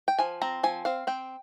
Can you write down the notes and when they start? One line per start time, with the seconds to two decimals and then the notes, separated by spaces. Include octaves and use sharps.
0.08 G5
0.19 F3 G#5
0.42 C4 A#5
0.63 F3 G#5
0.85 C4 F5
1.07 C4 G5